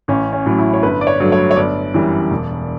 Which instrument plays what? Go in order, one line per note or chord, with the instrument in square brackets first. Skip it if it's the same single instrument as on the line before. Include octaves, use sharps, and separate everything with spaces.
[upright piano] A1 C#4
C#4
A2 F#3
E4
C#5
G1 B4
D5
C#5
G2 F#3 A3
C#5
C#5
G1 D5
F#2 E3 G3
E1